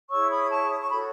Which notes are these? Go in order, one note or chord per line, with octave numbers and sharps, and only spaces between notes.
E4 G#4 C#5 C#6 E6
B5 D#6
A5 C#6
D#6
C#6
F#4 A4 C#5 B5